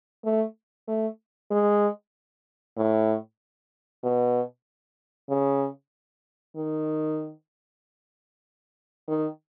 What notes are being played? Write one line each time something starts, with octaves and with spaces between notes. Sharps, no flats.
A3
A3
G#3
A2
B2
C#3
D#3
D#3